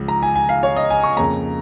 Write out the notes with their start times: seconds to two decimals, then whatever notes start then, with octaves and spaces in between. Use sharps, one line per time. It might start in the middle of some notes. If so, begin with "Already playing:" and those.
Already playing: C#2 C#3 F3
0.08 A#5
0.23 G#5
0.36 G#5
0.49 F5
0.63 C#5
0.76 D#5
0.90 G#5
1.04 C#6
1.17 F2 C#3 A#3 C#4 A#5